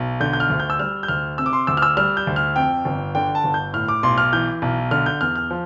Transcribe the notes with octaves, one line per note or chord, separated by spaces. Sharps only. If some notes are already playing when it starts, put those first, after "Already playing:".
Already playing: B1
D3 G6
G6
F6
D2
G6
E6
G3 F6
G6
D2 F6
C3 E6
D6
C6
D2 E6
F6
E6
G3 F6
G6
D2
F6
F2 G5
G1
D3 G5
A5
G1
G6
A2 F6
D6
B1 C6
F6
E3 G6
B1
D3 F6
G6
E2 F6
F6
F3